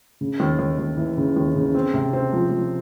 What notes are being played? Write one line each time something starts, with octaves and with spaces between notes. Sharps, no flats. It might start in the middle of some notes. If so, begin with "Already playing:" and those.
C#3
D#2
D#2
D#2
E3
C#3
D#2
C#3
C4
C3
C4
F3
F3